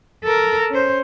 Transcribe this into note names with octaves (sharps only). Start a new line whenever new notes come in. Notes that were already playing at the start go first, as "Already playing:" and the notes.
A4 A#4
C#4 C5